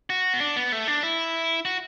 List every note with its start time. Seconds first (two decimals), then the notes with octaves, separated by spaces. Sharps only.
0.10 F#4
0.34 B3
0.41 D4
0.56 B3
0.72 A3
0.87 D4
1.03 E4
1.65 F#4